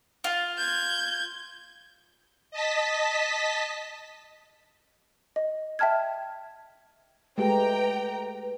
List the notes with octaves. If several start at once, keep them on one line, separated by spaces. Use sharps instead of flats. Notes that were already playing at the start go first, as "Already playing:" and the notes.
F4
G6 G#6
D#5 A5 B6
D#5
E5 G5 A5 F6 G#6
G#3 A3 G4 B4 G5 A#5